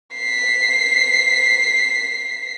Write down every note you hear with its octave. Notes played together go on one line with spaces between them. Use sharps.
B6 C7